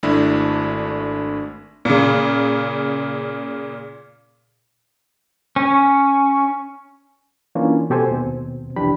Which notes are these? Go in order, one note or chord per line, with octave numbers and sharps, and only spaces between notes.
G#1 A3 D4 E4 B5
A#2 C#3
C#4
E3 A#3 C#4 D4 E4 F4
B2 G4 A4 C5 G#5
D#2 B2 C4
C2 F2 E3 D4 G4 B5